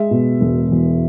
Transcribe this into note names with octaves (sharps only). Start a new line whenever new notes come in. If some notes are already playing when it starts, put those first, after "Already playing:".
Already playing: G#3 E5
B2
E1
E2